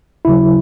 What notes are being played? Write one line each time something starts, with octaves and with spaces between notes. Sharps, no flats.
D#2 C#3 F#3 E4